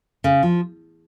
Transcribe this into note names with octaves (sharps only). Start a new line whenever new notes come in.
C#3
F3